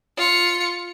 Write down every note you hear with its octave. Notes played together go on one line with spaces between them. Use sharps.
F4 C#7